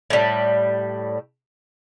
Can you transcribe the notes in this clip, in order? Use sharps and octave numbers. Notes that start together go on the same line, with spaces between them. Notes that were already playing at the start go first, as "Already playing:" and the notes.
A2 G3